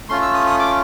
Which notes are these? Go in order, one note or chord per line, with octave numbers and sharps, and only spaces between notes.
A3 C#4 F4 C6
E6
D#6
D#6
D6